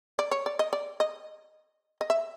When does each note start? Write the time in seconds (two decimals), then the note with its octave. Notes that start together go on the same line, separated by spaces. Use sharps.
0.19 D5
0.31 C#5
0.46 D5
0.59 D#5
0.73 D5
1.00 D#5
2.01 D#5
2.10 E5